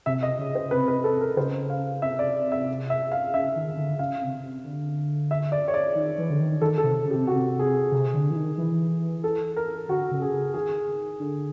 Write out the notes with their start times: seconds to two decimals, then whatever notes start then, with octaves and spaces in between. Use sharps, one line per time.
0.06 C3 E5
0.23 D#5
0.39 C#3
0.55 C5
0.71 C3 B4
0.88 B4
1.04 A4
1.21 A#4
1.37 C#3 C5
1.70 F5
2.02 C3 E5
2.19 D5
2.52 E5
2.90 E5
3.12 F5
3.33 C#3 E5
3.56 D#3
3.77 D3
3.99 C#3 F5
4.21 C3
4.43 C3
4.64 D3
5.31 E5
5.52 D5
5.68 C#5
5.74 D5
5.95 D#3
6.18 E3
6.30 D3
6.40 D#3
6.61 D#3 A4
6.78 A4
6.84 C3
7.05 C#3
7.11 G4
7.15 C3
7.27 F#4
7.35 C3
7.59 G#4
7.92 C3
8.14 D3
8.30 E3
8.36 D#3
8.58 E3
9.24 A4
9.56 A#4
9.88 D3 F#4
10.11 C#3
10.22 G#4
10.54 D#3 G#4
10.87 D#3
11.19 D3